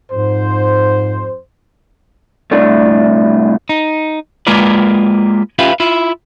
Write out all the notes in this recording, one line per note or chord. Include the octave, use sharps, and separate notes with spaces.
F2 G#2 C5
C2 A2 A3 D4
D#4
G#3 A#3 F4 A#4 B4 D5
C#4 F4 G4 B4 E5 F5
E4 F4